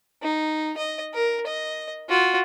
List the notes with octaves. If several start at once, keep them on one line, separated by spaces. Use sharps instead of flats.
D#4
D#5
A#4
D#5
F4 F#4